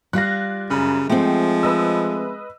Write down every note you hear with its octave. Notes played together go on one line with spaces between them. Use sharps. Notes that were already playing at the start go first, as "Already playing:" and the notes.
G3 F4 F5 F#6 A#6
F#2 C#3 B5
F3 G#3 A3 C4 G5
B4 D#5 E6